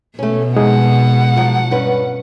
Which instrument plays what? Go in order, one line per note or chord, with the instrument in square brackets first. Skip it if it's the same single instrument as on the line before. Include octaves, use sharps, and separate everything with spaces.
[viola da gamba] B2 [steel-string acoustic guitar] A3 C#4
[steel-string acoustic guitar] F2 [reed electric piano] G#3 D#4 G#4 [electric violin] F#5
[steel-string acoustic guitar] F3 F#3 F4
G2 C#4 B4